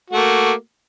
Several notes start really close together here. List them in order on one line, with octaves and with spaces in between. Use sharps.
F#4 A3 A#3